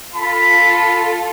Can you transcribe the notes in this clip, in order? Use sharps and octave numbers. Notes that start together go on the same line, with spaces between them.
F4 A4 B5